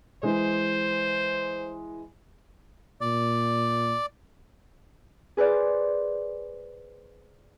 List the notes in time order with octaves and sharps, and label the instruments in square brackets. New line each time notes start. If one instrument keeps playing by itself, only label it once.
[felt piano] E3 G#3 [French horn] C5
[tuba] A#2 [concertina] D5
[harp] G#4 B4 C5 D5